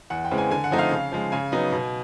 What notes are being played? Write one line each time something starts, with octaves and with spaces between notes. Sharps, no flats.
E2 F#5
G5
C#3 E3 G#3 C4
G#5
D3 G#5
F#5
F3 A3 C4 D#4
F5
C#3
F3 G#3
C#3 G#5
F#3 B3 D#4
B2